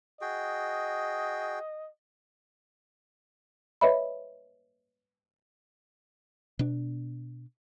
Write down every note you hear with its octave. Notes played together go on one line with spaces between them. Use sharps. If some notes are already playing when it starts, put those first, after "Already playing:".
F#4 G#4 D#5 G5
B4 C#5 D#5 E5 B5
B2 D4